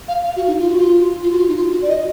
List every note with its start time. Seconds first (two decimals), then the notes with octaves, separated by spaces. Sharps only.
0.08 F5
0.25 F5
0.36 F#4
0.47 D#4
0.58 F4
0.69 F#4
0.79 F4
1.23 F4
1.32 F#4
1.39 F4
1.48 D#4
1.56 F4
1.72 F#4
1.82 D5
1.89 D#5